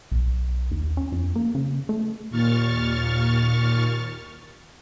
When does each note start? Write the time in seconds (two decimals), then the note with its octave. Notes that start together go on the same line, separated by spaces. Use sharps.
0.11 B1
0.71 D#2
0.97 C#4
1.12 F2
1.36 A#3
1.55 C#3
1.89 A3
2.30 D#2 A#2 C#6 F6 A6